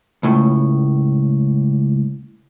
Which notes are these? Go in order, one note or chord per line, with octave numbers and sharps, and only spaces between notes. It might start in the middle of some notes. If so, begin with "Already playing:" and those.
C#2 A2